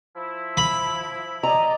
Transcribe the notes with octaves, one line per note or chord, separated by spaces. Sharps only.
F3 E4
B5
D5 D#5 A#5